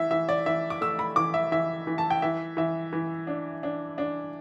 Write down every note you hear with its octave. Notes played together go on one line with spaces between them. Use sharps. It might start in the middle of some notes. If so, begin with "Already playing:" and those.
Already playing: E3 E5
E3 E5
D5
E3 E5
D6
A3 E6
B5
E3 D6
E5
E3 E5
E3
A5
G5
E3 E5
E3 E5
E3
D4
D4
D4